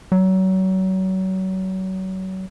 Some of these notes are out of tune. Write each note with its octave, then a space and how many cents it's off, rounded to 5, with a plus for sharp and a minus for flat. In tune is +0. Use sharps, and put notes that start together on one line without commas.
F#3 +30